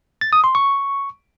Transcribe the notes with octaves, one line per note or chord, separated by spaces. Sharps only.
A6
D#6
C6
C#6